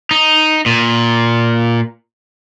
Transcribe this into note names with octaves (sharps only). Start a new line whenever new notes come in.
D#4
A#2